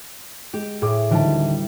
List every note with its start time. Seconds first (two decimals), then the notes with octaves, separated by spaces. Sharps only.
0.53 G#3 G4
0.82 A2 G#4 D6
1.11 D2 D#3 E3 G3 A5